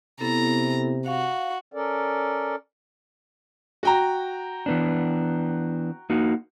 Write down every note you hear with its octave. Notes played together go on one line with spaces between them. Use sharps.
C3 B3 E4 A4 A#5
F#4 F5
C#4 A4 A#4 D5
F#4 G5 A#5
E3 B3 D4
A#3 D#4 F#4